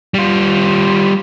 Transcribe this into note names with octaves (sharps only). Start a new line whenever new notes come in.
G3 F4